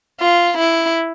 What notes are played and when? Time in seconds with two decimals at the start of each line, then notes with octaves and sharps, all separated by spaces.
0.20 F4
0.57 E4